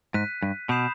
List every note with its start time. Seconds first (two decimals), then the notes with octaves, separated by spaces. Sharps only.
0.14 G#2 F#6 B6 D#7
0.43 G2
0.69 B2 B5 D#6 G6 C7 E7